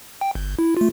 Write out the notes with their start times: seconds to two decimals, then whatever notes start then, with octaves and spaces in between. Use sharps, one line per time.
0.21 G5
0.35 G1
0.59 E4
0.77 A3 F4